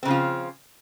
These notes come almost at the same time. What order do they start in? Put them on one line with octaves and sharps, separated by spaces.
C4 C#3 F3 F4